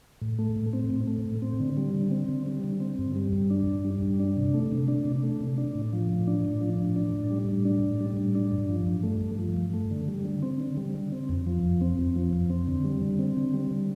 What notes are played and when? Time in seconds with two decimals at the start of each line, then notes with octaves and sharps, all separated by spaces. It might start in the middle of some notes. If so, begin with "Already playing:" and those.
0.21 A2
0.39 A3
0.56 A2
0.73 C4
0.90 A2
1.07 A3
1.26 A2
1.42 C4
1.60 D3
1.77 G3
1.94 D3
2.11 C4
2.28 D3
2.46 G3
2.64 D3
2.80 C4
2.99 G2
3.16 G3
3.33 G2
3.50 D4
3.67 G2
3.85 G3
4.02 G2
4.20 D4
4.37 C3
4.54 A3
4.72 C3
4.88 D4
5.05 C3
5.23 A3
5.40 C3
5.58 D4
5.75 A2
5.93 F3
6.09 A2
6.27 D4
6.44 A2
6.61 F3
6.79 A2
6.96 D4
7.14 A2
7.30 G3
7.48 A2
7.65 D4
7.83 A2
8.01 G3
8.17 A2
8.35 D4
8.52 G2
8.69 F3
8.87 G2
9.03 A3
9.21 G2
9.38 F3
9.56 G2
9.74 A3
9.91 D3
10.08 G3
10.25 D3
10.42 C4
10.60 D3
10.77 G3
10.94 D3
11.12 C4
11.29 F2
11.46 F3
11.63 F2
11.81 C4
11.99 F2
12.16 F3
12.33 F2
12.50 C4
12.67 D3
12.84 G3
13.01 D3
13.19 C4
13.37 D3
13.54 G3
13.71 D3